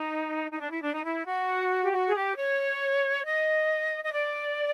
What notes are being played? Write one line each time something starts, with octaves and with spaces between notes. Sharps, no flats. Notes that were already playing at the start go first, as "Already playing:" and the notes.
Already playing: D#4
D#4
D4
E4
D4
D#4
E4
F#4
G4
F#4
G#4
G4
C#5
D#5
D#5
D5